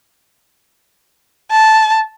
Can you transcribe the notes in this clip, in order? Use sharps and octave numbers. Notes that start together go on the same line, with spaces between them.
A5